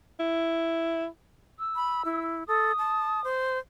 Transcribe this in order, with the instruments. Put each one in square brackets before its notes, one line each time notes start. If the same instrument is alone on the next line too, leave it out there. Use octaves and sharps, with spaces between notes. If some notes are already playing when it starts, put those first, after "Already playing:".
[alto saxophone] E4
[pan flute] E6
[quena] B5
E4
[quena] A4 [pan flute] D#6
[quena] A5
C5